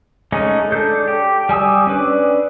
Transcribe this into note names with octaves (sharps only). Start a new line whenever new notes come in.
G#3 A3 C#4 D#4
D4 A4 G6
G4
G3 G#5 D#6 E6
C#4 D4 B4